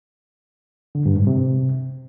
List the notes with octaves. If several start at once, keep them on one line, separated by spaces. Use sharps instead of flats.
D3
G2
G#2
C3